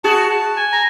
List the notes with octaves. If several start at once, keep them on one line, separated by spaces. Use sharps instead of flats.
F#4 G#4 A5
A5
G#5
A#5